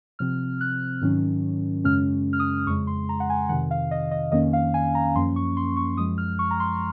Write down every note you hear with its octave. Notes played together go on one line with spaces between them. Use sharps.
C3 F3 C4 F6
F#6
G#2 D#3 F#3 C#4
F#2 C#3 G#3 C#4 F6
F6
D#6
F2 C#3 G#3 C#6
C6
A#5
F#5
G#5
F2 C3 D#3 F#5
F5
D#5
D#5
F2 D#3 A#3 C#4 D#5
F5
G#5
A#5
F#2 F3 A#3 C#4 C6
C#6
C6
C#6
F#2 F3 G#3 D#6
F6
C#6
A#5
C6